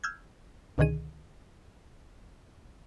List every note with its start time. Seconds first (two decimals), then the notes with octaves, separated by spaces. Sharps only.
0.04 E6 F6 G6 G#6
0.78 C#2 B2 D3 D#3 G#4 D#7